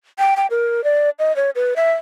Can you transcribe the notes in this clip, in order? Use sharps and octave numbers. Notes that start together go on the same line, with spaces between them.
G5
G5
A#4
D5
D#5
C#5
B4
E5